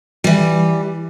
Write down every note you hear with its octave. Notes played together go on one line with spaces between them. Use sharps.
E3 G3